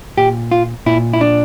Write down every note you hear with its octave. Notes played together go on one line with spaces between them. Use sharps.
A#2 G4
F4
A#2 E4
E4
D4